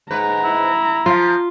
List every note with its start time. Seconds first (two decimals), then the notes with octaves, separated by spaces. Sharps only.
0.11 G#2 B4 A#5
0.44 E4
1.06 F3 F4